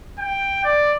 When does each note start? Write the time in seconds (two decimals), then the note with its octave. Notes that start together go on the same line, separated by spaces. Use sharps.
0.19 G5
0.64 D5